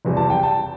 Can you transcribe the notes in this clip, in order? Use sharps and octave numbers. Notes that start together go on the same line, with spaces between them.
F1 E2 E3 G3
A5
G5
A5